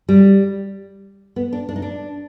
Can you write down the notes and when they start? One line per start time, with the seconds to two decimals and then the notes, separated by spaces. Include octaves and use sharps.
0.09 G3
1.36 B3
1.53 D4
1.69 D4
1.76 D#4
1.82 D4